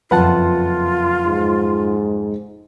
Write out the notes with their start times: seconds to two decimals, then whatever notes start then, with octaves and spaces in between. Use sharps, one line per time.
0.11 F#1 F2 F4 B4 F#5 A5
1.26 G#2